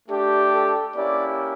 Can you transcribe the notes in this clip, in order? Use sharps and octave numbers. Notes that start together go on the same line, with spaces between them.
A3 D4 G4
A4
A#3 C#4 E4 G4 D5